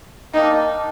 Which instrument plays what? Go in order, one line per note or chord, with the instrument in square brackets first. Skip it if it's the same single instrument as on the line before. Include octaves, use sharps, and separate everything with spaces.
[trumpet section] G3 A#3 D4 [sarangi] D#4